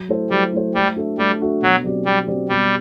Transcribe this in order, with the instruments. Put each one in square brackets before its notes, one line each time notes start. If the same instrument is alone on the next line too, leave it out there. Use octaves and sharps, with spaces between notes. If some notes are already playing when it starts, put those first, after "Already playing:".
Already playing: [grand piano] F#3
A3 E4 A4 C5
[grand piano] F#3 [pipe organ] G3
[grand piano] A3 E4 A4 C5
[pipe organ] G3 [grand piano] A3
[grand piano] D4 F#4 A4 E5
[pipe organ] G3 [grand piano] A3
[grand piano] D4 F#4 A4 E5
[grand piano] B2 [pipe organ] F#3
[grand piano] F#3 C4 G4 D5
[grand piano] B2 [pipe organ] G3
[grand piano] F#3 C4 G4 D5
[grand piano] B2 [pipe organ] G3